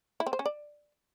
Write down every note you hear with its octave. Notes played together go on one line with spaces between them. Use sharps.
E4
C4
C5
C#4
D5